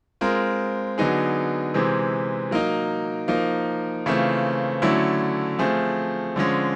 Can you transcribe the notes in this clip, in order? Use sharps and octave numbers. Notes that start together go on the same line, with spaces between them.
G#3 C4 F4 A#4
D3 F#3 B3 D#4 G#4
C3 E3 G#3 C4
F#3 A#3 D#4
F3 A#3 D#4
C#3 E3 A3 C4 F4
D3 F#3 A3 C#4 E4
F3 A3 C4 F4 G#4
D3 F3 G#3 C#4